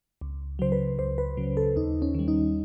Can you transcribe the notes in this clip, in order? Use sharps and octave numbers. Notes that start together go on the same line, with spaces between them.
C#2
C#3 F#3 C5
B4
C#2 C5
B4
C#3 F#3
A4
D#2 D#4
C#4
D#3 G3
D#4